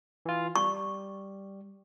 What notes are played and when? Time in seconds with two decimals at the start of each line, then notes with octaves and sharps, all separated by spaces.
0.26 E3 F4
0.56 G3 C#6